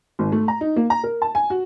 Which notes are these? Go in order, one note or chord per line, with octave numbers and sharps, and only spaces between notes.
G#1
A3
A#5
D#4
A#3
A#5
A#4
A5
G#5
F#4